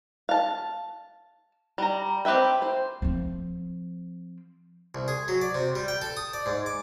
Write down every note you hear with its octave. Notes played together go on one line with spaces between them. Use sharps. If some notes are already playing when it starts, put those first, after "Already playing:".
F5 A5
G3 A#5
C4 G4 B4 E5 G5
C5
F3 C4
C2
G#4
F#3
D5
C3
G3
G5
A4
D#6
D5
G#2
D6